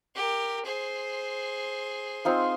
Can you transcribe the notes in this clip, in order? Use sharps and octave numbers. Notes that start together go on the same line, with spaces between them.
G4 A#4
G#4 C5
C4 D#4 F4